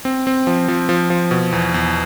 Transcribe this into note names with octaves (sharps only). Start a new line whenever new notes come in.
C4
C4
F3
F3
F3
F3
B2
E2
E2